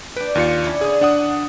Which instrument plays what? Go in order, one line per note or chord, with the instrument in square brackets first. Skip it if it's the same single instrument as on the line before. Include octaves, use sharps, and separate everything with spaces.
[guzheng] D4 G5 [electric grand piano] B4
[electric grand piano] D#2 F4 C#7
[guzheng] C#4 D4 E4
[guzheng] D3 F5 [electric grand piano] G#4 D#6
[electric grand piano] D4 F#5 D#6